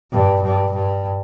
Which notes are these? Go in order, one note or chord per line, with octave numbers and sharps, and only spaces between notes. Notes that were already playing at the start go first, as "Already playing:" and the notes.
G2
G2
G2